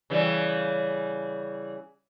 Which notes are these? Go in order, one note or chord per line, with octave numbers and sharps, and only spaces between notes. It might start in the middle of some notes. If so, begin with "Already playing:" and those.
C#3 E3 G3